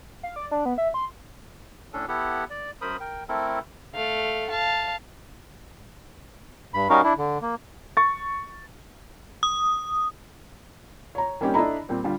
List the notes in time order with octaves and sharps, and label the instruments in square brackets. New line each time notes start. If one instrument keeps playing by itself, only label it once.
[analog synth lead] F5
D5
D4
B3
E5
C6
[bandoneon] A2 C#4 D4 A4
B3 E4 G4 A4 F#5
D5
F#2 A#4 C5 B5 D#6
A#4 G5
A3 C4 E4 A4 A#4
[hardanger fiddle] A3 F5
F5 A5
[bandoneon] G2 B5
G3 C#4 D#4 F#4 A#4 F5
D4 E4
D3
A#3
[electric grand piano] C#6 A6
[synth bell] D#6
[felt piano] C#5 A#5
G3 A#3 C4 C#4 D#4 G4
D4 E4 A4 D#5 A#5 B5
A#2 G3 C4
D3 G3 F4